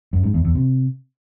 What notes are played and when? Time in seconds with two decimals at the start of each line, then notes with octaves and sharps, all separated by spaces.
0.13 F#2
0.23 G#2
0.34 E2
0.45 E2
0.55 C3